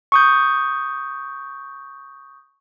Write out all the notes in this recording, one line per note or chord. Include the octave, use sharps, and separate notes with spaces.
C#6 D#6 G6